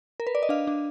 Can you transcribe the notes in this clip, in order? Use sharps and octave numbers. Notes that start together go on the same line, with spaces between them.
A#4
B4
D5
D#5
D4 F5
D4